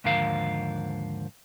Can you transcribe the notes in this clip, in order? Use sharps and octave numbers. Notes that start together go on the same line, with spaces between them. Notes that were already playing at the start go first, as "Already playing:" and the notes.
D#2 G#2 D3 F3 A#4 F5